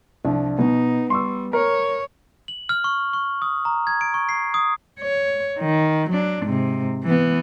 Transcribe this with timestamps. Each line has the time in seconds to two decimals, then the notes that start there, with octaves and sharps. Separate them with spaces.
0.25 C2 F3 D4
0.59 B2 B3 D#4
1.10 G3 C6 C#6 E6
1.53 A#4 C#5
2.48 F#7
2.69 F6
2.84 C#6
3.13 C#6
3.42 D#6
3.65 A#5
3.87 G#6
4.01 D7
4.14 C#6
4.29 C7
4.54 D#6
5.00 C#5
5.59 D#3
6.10 F#3 D4
6.44 G#2 C3
7.04 E3 B3